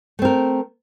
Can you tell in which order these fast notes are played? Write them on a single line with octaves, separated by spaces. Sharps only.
A3 C4 A#4